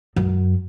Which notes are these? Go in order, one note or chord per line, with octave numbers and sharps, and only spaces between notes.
F#2